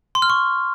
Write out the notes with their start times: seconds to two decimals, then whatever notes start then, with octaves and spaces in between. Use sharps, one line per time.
0.15 C6
0.22 F6
0.30 C#6